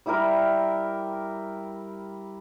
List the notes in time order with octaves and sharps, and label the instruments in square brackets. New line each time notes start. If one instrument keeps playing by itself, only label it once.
[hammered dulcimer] G3 E4 G4 A#4